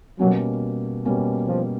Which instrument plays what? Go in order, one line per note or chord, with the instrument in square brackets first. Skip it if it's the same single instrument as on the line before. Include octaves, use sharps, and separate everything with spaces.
[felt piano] B2 G3 A#3 C#4 [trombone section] F#3
[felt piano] B2 G3 A#3 C#4
[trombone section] F3